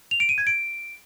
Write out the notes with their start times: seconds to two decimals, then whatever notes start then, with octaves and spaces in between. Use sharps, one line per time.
0.11 F7
0.20 D7
0.29 D#7
0.38 G#6
0.47 D7